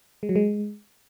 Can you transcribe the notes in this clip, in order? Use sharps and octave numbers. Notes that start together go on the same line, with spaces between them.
G#3
F#3
G#3